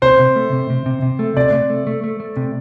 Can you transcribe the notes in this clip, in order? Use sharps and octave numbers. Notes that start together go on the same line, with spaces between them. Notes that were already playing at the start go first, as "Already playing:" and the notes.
C3 C5
C3
A3
C3
C3
C3
C3
A3
C3 D5
C3
A3
A3
A3
A3
C3